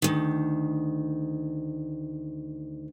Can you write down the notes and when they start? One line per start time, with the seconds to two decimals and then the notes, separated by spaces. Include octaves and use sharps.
0.02 D2 D#3